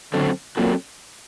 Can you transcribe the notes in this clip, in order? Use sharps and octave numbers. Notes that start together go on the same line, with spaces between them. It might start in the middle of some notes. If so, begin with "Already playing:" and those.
F#2 D3 F#3 C4 F#4 A4
F#2 A#2 F#3 C4 F#4 A4